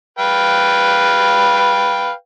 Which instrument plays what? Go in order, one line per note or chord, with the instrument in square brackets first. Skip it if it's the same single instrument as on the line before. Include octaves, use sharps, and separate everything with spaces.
[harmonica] B4 F5 G5